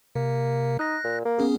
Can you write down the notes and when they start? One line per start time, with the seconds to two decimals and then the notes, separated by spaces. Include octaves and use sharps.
0.15 C3 A#3
0.79 D#4 F#6 A#6
1.04 A#2
1.25 A#3
1.39 B3 C#4 G#4